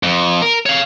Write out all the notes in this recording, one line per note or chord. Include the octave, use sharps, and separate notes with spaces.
F2
A#4
C#5 F5